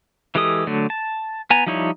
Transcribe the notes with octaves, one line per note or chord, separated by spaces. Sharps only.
E3 G#3 G4 A4 D#6
D3 F#3 A3
A5
B3 G#5 A#5
F3 G3 D#4 E4 C#5